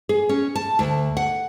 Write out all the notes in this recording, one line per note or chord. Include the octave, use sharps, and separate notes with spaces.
G#4
C#4
A5
D2
F#5